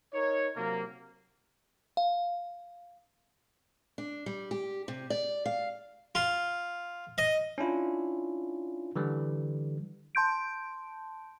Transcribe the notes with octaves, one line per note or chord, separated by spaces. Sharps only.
D#4 A#4 C#5
C3 F#3 A#3
F5
D4
G3
G4
C3
D5
F5
F4
D#5
C#4 D4 E4 F4
D3 E3 G3
A5 C6 G6 D7